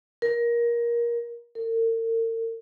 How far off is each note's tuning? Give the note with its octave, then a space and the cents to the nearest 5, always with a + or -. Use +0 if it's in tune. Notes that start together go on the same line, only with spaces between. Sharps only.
A#4 +20
A#4 -45